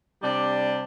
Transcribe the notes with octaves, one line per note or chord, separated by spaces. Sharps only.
C3 G3 D4